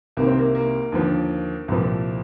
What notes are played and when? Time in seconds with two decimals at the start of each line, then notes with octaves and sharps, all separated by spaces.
0.17 C2 C3 D#3 A#3
0.27 C4
0.39 A#3
0.55 A#3
0.92 D#2 D3 F3
1.68 C2 A#2 F3